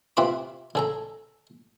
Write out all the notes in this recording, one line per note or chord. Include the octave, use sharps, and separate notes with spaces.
C3 C4 F4 B4 B5 D6
C#3 A4 A#5